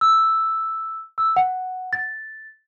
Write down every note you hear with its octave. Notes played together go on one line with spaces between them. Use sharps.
E6
E6
F#5
A6